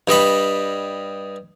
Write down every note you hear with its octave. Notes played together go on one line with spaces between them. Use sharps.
G2 G3 D#5 B5